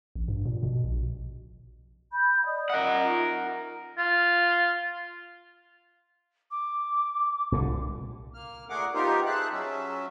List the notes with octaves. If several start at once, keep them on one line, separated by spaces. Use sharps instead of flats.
A1
G2
A#2
B2
A#1
B5 G6
D5 D#5 D#6
A#4 D#5 F#5
D#4 F4
F4
D6
C2 A#2 D3
A#3 F6
A#2 A3 G#4 A#4 F#5 D6
B3 D#4 F4 G4 A#4 C5
G#4 E5 A5 F#6
F#3 C#4 E5